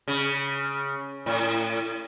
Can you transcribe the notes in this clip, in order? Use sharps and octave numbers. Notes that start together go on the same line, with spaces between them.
C#3
A2